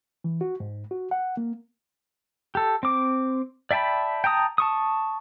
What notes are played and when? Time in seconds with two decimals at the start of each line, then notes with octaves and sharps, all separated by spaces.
0.24 E3
0.41 F#4
0.60 G#2
0.91 F#4
1.11 F#5
1.37 A#3
2.55 G4 A4
2.83 C4 D6
3.71 D5 E5 G5 A5 B5
4.24 G5 A5 A#5 D#6
4.58 A5 C#6 D#6